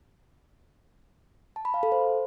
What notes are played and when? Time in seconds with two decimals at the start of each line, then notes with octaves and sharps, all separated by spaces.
1.56 A5
1.65 B5
1.74 F5
1.83 A4
1.92 C5